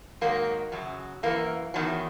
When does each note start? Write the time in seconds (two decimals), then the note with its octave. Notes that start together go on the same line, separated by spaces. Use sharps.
0.21 G#2 D#3 F#3 A#3
0.72 F#2 C#3 F#3
1.23 F#2 E3 A#3
1.74 E2 D#3 F#3